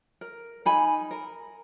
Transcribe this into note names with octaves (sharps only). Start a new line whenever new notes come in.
A#4
D#4 G#5 B5
A#4